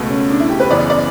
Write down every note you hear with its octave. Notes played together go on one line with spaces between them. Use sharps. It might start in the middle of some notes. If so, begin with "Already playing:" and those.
Already playing: C#2 B2 A3
C#4
D4
E4
G4
B4
F#2 C#3 E3 B3 D5
D5